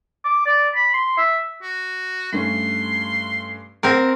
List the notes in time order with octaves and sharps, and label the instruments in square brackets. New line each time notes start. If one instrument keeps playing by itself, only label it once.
[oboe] D6
D5
B5
C6
E5
[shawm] F#4
[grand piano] G2 A3 C#4 [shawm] C6
[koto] C4 A#4 [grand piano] F#5 A#6